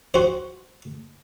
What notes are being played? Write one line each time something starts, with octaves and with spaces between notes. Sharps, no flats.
F#4 C5